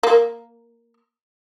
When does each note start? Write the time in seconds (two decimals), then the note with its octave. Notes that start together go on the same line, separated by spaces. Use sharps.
0.03 A#3